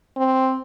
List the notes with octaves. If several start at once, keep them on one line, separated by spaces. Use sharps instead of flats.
C4